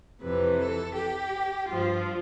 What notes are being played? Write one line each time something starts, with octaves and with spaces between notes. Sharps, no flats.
F2 C3 E3 B4
A4
G4
G2 F3 F4